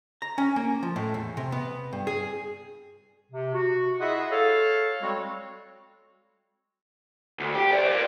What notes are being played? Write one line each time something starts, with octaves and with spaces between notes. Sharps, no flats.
A#5
C#4
A#3
F3
A2
E2
C3
B3
G2
G#4
C3
F#4
E4 F4 G#4 D#5 E5 F#5
A4 C#5 F5
G3 G#3 C4 F#4 A4 C#5
D2
G4
C5 D5
A#4 D5